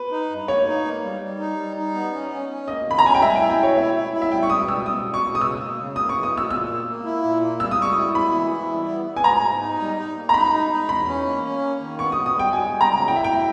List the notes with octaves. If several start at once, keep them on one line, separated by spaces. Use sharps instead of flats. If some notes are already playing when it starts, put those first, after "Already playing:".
Already playing: B4
D#4
G2
A#3 C#5
D#4
A#3
G3
G3
D#4
G3
D#4
B3
C#4
C#4
C#4
A#3 D#5
D#3 B5
A#5
C#4 G#5
G5
G3 E5
G#5
E4 G5
G5
B2 C#5
E4 E5
E4
E4
E5
G3 G5
C#6
B2 D#6
G3 E6
B2 D#6
B2
C#6
B2
D#6
C#3 E6
A#3
C#3
A#3 D#6
C#6
E3
D#6
A#3 E6
A#2 E6
A#3
A#3
E4
A#2
A#3
G3 E6
D#6
G3 C#6
E4 D#6
E4 B5
E3
E4
G3
B3
B3
G#5
G#2 A#5
G#2
D#4
G3
D#4
A#3
A#5
D#4 B5
D#4
D#4
E2 B5
C#4
A#3
C#4
A#3
D#3
B3 C#6
B3 D#6
D#6
G3 G5
G3 G#5
G3
A#5
C#3
E4 G5
E5
E4 G5